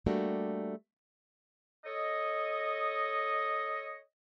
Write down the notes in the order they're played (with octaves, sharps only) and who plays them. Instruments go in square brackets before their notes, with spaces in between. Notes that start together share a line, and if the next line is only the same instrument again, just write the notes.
[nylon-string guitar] G3 A3 A#3 D4 F#4 G4
[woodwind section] A4 C#5 D#5